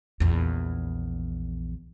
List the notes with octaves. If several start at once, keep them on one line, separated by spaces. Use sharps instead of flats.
A#1 E2